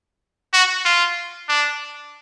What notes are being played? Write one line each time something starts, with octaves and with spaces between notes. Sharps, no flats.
F#4
F4
D4